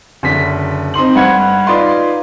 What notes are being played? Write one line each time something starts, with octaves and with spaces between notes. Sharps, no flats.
F#1 D3 B6
C4 D#4 C6 F#7
G2 F#5 G#6
D#4 F4 B4 D5 C6